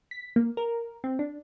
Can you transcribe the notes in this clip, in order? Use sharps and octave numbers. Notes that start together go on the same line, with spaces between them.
B6
A#3
A#4
C4
D4